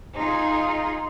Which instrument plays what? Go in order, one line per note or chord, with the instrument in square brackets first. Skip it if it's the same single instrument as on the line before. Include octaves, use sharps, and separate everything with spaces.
[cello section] D#4 F4 G#4